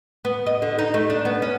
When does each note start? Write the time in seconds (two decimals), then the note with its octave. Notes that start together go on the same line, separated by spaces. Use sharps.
0.25 B3
0.46 D#5
0.62 D3
0.79 D#4
0.94 A3
1.10 D4
1.25 B3
1.42 C#4